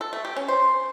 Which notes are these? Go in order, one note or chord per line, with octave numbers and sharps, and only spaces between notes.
A4
A3
G4
C#4
C5